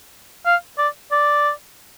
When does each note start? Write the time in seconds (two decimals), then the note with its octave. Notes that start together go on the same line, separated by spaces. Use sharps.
0.46 F5
0.78 D5
1.12 D5